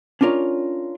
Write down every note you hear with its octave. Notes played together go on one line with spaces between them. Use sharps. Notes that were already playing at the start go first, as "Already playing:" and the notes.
C#4 D4 F4 A#4 C#5